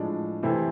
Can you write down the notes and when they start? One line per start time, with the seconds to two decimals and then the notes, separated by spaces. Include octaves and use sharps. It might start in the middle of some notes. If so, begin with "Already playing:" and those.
Already playing: A2 F3 G#3 D4
0.43 C3 E3 A3 C4 E4